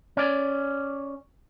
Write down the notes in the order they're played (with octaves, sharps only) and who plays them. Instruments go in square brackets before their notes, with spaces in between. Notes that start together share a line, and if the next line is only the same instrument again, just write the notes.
[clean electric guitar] C#4 D5